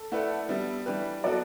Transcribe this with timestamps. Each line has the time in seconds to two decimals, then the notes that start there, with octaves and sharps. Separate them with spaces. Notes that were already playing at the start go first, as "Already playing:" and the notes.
Already playing: A4
0.12 A3 E4 B4 D5 F#5
0.49 G3 B3 D4 E5
0.86 E3 G3 D4 G4 B4
1.24 F#3 B3 F#4 A4 D5